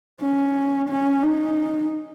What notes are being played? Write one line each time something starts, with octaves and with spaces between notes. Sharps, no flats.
C#4
C#4
D#4